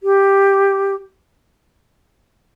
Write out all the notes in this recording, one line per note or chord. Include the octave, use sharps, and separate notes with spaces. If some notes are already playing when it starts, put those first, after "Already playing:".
G4